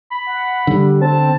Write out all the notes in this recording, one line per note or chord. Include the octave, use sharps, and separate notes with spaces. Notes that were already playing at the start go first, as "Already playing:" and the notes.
B5
F#5
D3 G3
C4 A5